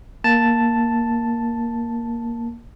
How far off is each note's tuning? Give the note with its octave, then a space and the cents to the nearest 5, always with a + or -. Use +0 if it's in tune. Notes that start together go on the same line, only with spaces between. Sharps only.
A#3 +5 A5 +0